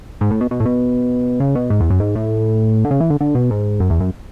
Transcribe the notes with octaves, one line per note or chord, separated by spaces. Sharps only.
G#2
A2
B2
B2
A2
B2
C#3
B2
G#2
E2
F#2
G#2
A2
D3
C#3
E3
D3
D3
B2
G#2
F#2
E2
F#2